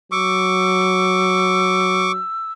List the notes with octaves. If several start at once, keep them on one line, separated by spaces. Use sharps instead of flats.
F#3 C#6 D6 E6